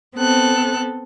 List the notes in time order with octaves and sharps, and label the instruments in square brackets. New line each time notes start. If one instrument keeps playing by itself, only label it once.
[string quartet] B3 C4 A4 F#6